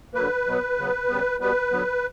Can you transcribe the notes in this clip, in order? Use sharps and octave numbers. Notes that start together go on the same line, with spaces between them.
D3 F#3 A#3 B4
B2 F#3 B3
C#3 F#3 B3
C#3 G3 B3
B2 G3 B3 B4
D3 F#3 B3